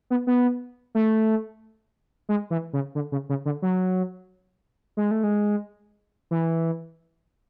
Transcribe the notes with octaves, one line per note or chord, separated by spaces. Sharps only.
B3
B3
A3
G#3
E3
C#3
D3
C#3
C#3
D3
F#3
G#3
A3
G#3
E3